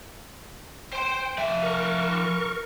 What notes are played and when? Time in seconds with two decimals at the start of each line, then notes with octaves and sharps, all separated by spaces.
0.92 C5 G5 C6
1.38 F3 E5
1.63 A#4 C#6